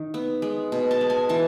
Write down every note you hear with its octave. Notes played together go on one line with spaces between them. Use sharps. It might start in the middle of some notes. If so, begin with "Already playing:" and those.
Already playing: D#3
B3
G#3
B2
A5
G#3
G#5
E3 A5